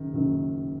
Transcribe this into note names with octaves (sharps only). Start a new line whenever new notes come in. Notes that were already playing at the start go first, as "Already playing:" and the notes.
Already playing: F#1 F#2 D#3
F#1 F#2 D#3